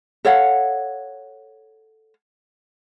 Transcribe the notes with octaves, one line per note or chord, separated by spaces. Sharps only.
A4 C#5 F5 F#5